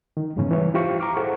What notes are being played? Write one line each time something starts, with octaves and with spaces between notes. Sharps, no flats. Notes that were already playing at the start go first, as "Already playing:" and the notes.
D#3
F2 G#2 C#3 E3 B3 C#4
E3 G3 C#5
E4 F4 G4 C5 F5 C#6
A#5 C#6 D6 F6
E4 G#4 A4 C5 F#5 C#6